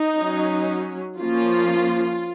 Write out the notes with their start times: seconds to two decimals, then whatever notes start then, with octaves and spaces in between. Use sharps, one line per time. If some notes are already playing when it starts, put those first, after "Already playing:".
Already playing: D#4
0.17 F#3 C#4
1.18 F3 A#3 C#4 F4